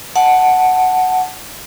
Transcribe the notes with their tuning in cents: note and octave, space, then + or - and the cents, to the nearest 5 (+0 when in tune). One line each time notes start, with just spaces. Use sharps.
F#5 +0 A5 +0